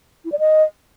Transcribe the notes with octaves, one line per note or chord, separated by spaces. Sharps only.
E4
D5
D#5